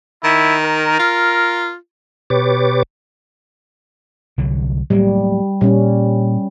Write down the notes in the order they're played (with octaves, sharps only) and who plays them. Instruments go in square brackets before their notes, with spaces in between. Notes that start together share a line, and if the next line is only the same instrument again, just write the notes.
[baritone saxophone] D#3 [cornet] E4
[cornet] A#4
[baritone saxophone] F4
[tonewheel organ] B2 G4 B4 C#5 D6 A6
[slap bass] C2 D3 F#3
[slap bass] A2 F#3 A#3 [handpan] G3
[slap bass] A#2 [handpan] G3 C#4